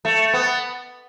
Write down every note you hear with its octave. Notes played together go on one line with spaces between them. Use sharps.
A3
B3